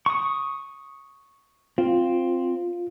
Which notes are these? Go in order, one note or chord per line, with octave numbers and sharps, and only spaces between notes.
C#6 D#6
C4 F4